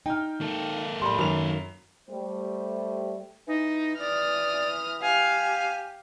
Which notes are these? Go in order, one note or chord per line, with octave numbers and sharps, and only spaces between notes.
D#4 G5 F6
A#3 A4
F5
A2 G3 B5 C6
F#2 D#3 B4 F7
G3 A3 C5
E3 D#4
D5 D#6 F6
G4 F5 G#5